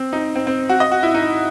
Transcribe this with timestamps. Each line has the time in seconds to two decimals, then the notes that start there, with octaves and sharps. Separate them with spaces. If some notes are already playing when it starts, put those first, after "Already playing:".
Already playing: C4
0.13 D#4
0.35 C4
0.47 C4
0.69 F#4
0.80 D#5
0.92 F#4
1.03 E4
1.14 D#4